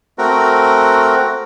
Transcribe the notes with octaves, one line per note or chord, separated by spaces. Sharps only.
A3 C4 F#4 A#4